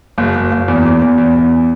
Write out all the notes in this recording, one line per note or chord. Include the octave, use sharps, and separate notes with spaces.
F#1
F#1
F#1
E2
E2
E2
E2
E2